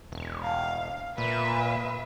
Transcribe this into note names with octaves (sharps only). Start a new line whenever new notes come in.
E1
F5
A#2 B4 E5